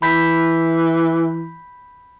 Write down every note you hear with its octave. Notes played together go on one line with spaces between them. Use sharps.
E3 B5 G6 B6